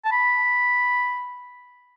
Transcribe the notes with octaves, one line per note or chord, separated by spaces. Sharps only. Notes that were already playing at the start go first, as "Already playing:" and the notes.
A5
B5